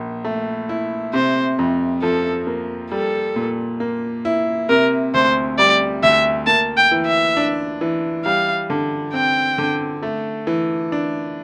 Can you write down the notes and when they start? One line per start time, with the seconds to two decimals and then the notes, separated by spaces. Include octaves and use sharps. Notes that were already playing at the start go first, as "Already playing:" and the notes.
Already playing: A#1 A#2
0.24 A3
0.69 E4
1.13 C3 C5
1.59 F2
2.02 F3 A4
2.47 A#3
2.91 G3 A4
3.36 A#2
3.80 A#3
4.25 E4
4.69 C3 A#4
5.14 D2 C5
5.58 G3 D5
6.03 D2 E5
6.47 A#3 A5
6.77 G5
6.91 E3
7.06 E5
7.37 D4
7.81 E3
8.25 G3 F5
8.70 D3
9.14 C4 G5
9.58 D3
10.03 A3
10.47 E3
10.92 D4